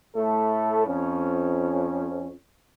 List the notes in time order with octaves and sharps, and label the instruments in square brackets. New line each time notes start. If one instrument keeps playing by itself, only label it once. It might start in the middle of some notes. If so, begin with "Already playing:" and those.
[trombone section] A2 A3 A4
F2 C#4